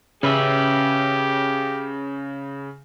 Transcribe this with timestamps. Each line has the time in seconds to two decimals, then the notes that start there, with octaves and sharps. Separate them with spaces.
0.23 C#3 C#4 G4 B4 E5